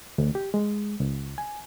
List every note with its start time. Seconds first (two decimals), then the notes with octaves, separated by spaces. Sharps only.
0.18 D2
0.35 G4
0.54 G#3
1.00 C#2
1.38 G#5